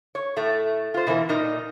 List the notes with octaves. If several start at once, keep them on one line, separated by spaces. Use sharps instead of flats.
C#5
A2 A3
F4 C5
B2 E3 E4 A#4
A#2 D#4 A#4 D#5